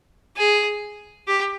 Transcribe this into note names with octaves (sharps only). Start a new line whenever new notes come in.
G#4
G4